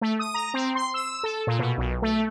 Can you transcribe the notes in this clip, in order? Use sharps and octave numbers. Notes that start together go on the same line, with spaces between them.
A3
D#6
A#5
C4
C6
E6
A4
A#2
B2
B1
A3